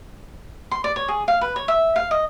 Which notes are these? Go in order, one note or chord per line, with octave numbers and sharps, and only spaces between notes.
C6
D5
C#5
G#4
F5
B4
C#5
E5
F5
D#5